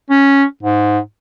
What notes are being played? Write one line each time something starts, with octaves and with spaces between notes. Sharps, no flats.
C#4
G#2